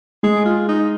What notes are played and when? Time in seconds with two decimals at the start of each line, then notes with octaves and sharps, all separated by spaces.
0.23 G#3 G#4
0.46 F4
0.68 D#4